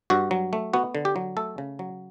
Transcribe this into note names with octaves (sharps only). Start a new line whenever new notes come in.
G2 F#4
F#3
A3
B3 F#4
D3
G4
F#3
A3 A4
C#3
F#3